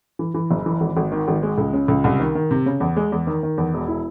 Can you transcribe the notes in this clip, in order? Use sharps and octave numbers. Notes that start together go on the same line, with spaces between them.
E3
E3
F#1
E3
G#1
G#1
D#3
G#1
G#3
C#2
C#3
C#2
C2
D#3
D#3
C3
C#3
E2
G#3
E2
D#3
D#3
E2
E1
E4